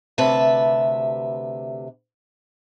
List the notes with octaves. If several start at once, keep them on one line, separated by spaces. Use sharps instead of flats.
D2 C3 B4 E5 A5